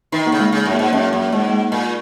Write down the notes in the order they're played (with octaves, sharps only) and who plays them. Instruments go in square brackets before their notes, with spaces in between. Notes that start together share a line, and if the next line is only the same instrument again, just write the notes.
[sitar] D#3 [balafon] D#4
[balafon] A#3
[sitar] C#3
[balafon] G#3
[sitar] C#3
F#2
[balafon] A#3
[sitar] G#2
[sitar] F#2 [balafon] C#4
[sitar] F#2 [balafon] A#3
[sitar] G#2 [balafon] G#3
[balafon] A#3
G#3
[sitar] A#2